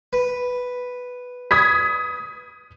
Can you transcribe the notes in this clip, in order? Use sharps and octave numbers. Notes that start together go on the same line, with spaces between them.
B4
D#6 G#6 B6